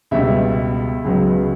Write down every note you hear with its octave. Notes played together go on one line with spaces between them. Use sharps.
C#2 B2 G3 E5
C#2 C#3 F#3 B3